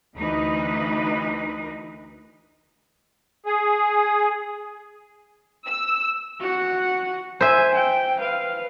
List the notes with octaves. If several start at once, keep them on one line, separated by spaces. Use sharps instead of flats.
D2 E3 D#4 B4
G#4
E6
F#4 F#5
C5 E5 G#5
G5
B4 F5